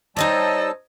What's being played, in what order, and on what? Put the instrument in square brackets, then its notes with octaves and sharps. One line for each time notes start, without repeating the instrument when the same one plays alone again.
[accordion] G3 A5 E6 [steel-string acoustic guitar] D#4 C5 C#5 [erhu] D#5